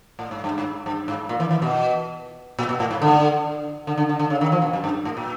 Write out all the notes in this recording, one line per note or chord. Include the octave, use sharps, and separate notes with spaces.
A2
G#2
G2
G#2
G2
G#2
A#2
E3
E3
B2
A#2
B2
A2
G#2
D3
D3
D3
D3
D3
C#3
D#3
F3
B2
F#2
G2
A2
A#2